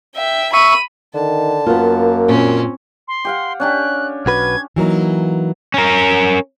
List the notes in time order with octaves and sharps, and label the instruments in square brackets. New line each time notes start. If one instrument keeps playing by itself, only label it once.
[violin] E5 G5
[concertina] E5 C#6 [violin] B5 D#7
[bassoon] D3 [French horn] D#3 [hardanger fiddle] A5
[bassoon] F#2 [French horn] A#3 [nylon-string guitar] B3 F4
[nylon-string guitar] A#2 [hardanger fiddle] C4 C#4
[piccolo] C6
[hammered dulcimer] G4 F5 F#5
[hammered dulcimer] C#4 D4 G4 [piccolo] F#6
[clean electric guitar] B1 F#4 B4 [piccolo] G#6
[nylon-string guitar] E3 F#3 A#3 D#4
[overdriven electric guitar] C#4 A#4